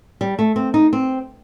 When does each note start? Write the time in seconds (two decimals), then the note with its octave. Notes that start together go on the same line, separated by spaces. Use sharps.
0.21 G3
0.39 A3
0.56 C4
0.74 D#4
0.93 C4